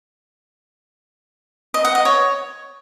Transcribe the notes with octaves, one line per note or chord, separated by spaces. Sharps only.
D#5
F#5
D#5
C#5